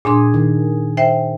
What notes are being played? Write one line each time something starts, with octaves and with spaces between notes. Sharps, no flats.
A#2 D4 G#4 C6
D#3
C5 E5 G5